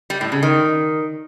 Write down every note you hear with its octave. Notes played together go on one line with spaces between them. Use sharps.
G3
A2
C#3
D#3